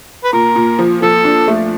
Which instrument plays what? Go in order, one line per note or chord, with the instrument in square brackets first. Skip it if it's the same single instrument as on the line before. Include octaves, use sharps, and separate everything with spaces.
[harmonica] B4
[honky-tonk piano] A#2 [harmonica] A#4
[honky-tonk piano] A#2
F3
[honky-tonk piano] F3 [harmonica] A4
[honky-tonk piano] D4
A3